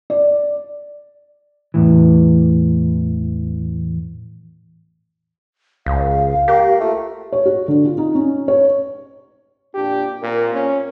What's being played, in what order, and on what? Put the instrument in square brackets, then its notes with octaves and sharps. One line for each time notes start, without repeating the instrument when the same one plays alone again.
[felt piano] D5
[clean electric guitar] E2 A2 E3
[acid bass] C#2 [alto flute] F5
[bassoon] A#3 [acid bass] G4
[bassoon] A3 [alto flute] F4
[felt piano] C#5
F#4
D3
F4
D#4
C#4
C#5
[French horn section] F2 A#2 D4 [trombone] G4
[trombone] A#2 [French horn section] C4 F4 A#4
[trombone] C#4